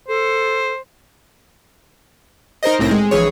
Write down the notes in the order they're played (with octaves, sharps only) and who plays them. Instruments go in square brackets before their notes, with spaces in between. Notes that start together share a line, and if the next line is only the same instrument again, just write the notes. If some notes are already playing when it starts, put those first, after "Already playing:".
[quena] A4 [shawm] C5
[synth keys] D#4 A#4 C5 D#5
C2 A2 C4 A#6
G#3
A#1 E3 G#4 C#5